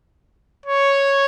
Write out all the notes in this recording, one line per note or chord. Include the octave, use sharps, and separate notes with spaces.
C#5